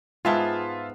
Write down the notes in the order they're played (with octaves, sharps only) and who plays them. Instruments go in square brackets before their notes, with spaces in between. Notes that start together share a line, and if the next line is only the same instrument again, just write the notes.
[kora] G#2 B3 G#4 [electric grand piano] F4 E5 A5